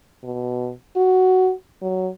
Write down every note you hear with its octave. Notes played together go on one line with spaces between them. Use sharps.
B2
F#4
F#3